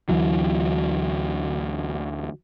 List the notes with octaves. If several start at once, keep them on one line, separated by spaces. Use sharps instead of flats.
D2 E3 F#3